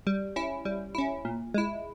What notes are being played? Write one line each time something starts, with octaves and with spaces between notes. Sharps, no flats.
G3
C#4 E4
G3
C#4 E4
A#2
G#3 E4